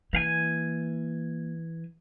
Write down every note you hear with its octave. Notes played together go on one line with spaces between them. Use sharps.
E3 A#3 F5 G#5